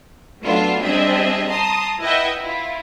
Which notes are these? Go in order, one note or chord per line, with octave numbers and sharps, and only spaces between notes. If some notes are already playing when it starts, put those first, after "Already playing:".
F#3 A3 B3 D4 F4
G3 C4 D4 G#4 D#5 E5
A5 A#5 C6 D#6
E4 B4 D#5 E5 F#5 G5
E4 F4